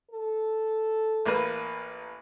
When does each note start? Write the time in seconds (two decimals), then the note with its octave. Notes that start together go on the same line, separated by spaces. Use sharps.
0.11 A4
1.26 A1 A#3 B4